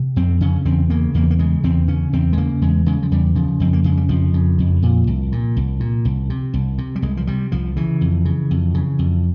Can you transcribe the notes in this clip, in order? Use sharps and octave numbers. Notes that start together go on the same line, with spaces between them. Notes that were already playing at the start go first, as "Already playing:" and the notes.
Already playing: C3
F2 C4
C#3 C#4
E2 C4
C#3 A#3
E2 A#3
A#3
C#3 G#3
E2 C4
C#3 C#4
E2 C4
G#3
C#3 A#3
E2 G#3
C#3 G#3
F3
E2 G3
C#3 F3
F2 C4
A#3
C#3 G#3
G3
F2 F3
C#3
F2
A#2
C2
A#2
C2
A#2
C2
C3
C2
C3
G3
C2 G#3
F3
C3 G3
C2 F3
C#3 E3
F2
C#3
F2
C#3
F2